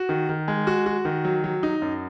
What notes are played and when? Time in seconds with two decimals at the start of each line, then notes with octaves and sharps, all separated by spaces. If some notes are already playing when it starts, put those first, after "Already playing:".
Already playing: F#4
0.09 D#3
0.29 D#3
0.48 G#3
0.67 F#4
0.86 F#4
1.05 D#3
1.25 F#3
1.44 F#3
1.63 D#4
1.82 F#2